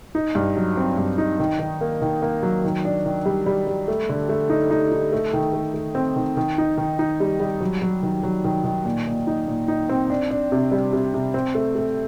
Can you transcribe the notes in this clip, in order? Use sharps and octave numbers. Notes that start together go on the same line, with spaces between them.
D#4
G2
F#3
C4
G2
D#4
D#3
D#3
A#3
D#3
A#3
F#3
D#3
D4
D#3
G3
G3
G3
A3
D3
A3
D#4
D#4
D#4
A3
D#3
A3
A3
C4
D#3
D#3
D#4
D#3
D#4
G3
G3
F#3
F#3
D#3
F#3
D#3
D#3
A#2
A#2
D#4
A#2
D#4
C4
D4
D4
C3
G3
C3
C3
C4
A3
A3